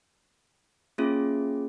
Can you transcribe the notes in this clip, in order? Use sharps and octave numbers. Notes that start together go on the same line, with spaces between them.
A#3 C#4 F4 G#4